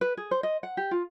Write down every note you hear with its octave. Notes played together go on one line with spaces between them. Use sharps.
B4
G#4
C5
D#5
F#5
G4
F4